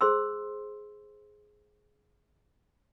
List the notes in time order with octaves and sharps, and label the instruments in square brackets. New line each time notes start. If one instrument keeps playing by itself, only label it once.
[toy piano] G#4 C5 C6 E6